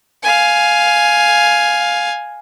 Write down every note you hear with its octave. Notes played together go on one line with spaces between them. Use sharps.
F5 G#5